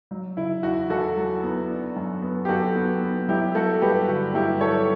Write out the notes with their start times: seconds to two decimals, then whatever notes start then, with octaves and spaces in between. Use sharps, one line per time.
0.11 F#3
0.37 C#3 E4
0.63 E2 F#4
0.90 E2 F#4 A4
1.17 F#3
1.43 B3
1.69 D4
1.97 F#2
2.22 B3
2.45 G4
2.49 F#2 F#4 A4
2.76 B3
3.02 B3
3.28 F#3 E4 G4
3.55 F#3 F#4 A4
3.82 G2 G4 B4
4.08 D3 F#4
4.34 G2 E4 G4
4.61 F#3 A4 C#5